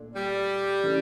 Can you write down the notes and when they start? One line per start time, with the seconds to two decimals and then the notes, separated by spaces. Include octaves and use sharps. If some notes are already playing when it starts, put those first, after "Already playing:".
Already playing: A#2 A3 D4
0.16 G3
0.83 C#3 E3 A3 D4